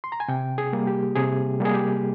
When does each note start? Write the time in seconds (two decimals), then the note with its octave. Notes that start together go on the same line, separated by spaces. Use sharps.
0.04 C6
0.12 A#5
0.20 G#5
0.28 C3 G5
0.58 G#4
0.73 G3 A#3
0.87 G4
1.16 C3 G#4
1.60 G3 A#3 G#4
1.74 G4